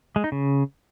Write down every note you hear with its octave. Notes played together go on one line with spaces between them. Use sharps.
G#3
D#4
C#3